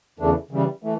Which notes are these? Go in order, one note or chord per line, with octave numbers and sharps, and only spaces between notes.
E2 C#3 E3 A3 D4
C#3 E3 G3
E3 A3